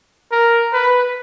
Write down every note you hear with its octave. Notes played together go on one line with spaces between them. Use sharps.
A#4
B4